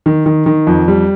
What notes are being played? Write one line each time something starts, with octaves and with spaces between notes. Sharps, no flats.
D#3
D#3
D#3
F2
G3